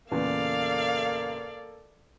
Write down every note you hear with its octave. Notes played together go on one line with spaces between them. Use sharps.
E2 A#2 C#3 A#3 A4 D5 F5